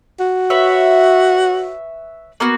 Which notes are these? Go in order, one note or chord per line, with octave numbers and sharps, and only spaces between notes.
F#4
B4 C#5 E5
A#3 B3 F#4